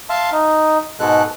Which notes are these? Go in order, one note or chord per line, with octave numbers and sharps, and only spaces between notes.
E5 F5 A5 C6
D#4
G#2 B2 G#3 A4 F#6